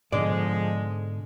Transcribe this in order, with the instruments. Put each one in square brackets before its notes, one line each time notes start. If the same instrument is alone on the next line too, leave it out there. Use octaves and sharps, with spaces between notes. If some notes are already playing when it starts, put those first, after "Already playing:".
[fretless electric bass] G#2 B2 D3 [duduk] F3 [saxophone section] G#3 [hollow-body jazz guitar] D5